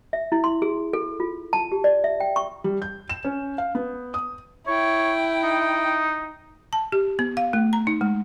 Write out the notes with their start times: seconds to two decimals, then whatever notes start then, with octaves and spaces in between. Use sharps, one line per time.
0.13 E5
0.32 E4
0.44 C6
0.62 G#4
0.93 A4
1.20 F4
1.53 A5
1.72 G4
1.84 D5
2.04 E5
2.20 G5
2.36 C#6
2.64 G3
2.82 G6
3.09 E7
3.24 C#4
3.58 F5
3.75 B3
4.14 D#6
4.67 E4 C#5 G5
5.43 D#4
6.73 A5
6.92 G4
7.19 B3
7.37 F5
7.53 A3
7.73 A#5
7.87 D#4
8.01 G#3